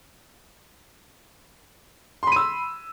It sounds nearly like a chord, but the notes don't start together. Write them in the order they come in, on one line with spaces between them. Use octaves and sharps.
C6 B5 D#7 E6